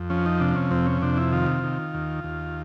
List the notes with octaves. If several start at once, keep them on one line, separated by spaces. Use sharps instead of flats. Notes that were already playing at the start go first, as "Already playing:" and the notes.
Already playing: F2
F3 C#4
D#4
C3 D4
C#4
F2 C4
C#4
C3 D4
E4
D#3 F4
D#3
D#2
D#2